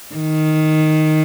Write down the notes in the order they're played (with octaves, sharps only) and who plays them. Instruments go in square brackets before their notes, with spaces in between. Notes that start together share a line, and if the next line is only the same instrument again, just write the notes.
[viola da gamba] D#3